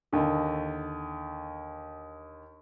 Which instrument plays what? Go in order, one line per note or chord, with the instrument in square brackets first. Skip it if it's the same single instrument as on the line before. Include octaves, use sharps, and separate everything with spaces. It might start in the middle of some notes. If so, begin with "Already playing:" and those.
[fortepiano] D#2 D3